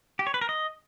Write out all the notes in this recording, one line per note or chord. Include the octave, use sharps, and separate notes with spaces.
G4
C#5
B4
A#4
D#5